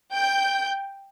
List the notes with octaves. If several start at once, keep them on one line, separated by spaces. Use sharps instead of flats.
G5 G6